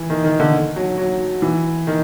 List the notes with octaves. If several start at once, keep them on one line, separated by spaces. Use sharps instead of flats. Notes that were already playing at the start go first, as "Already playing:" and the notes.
Already playing: E3
D#3
D#3
D3
F#3
F#3
E3
D#3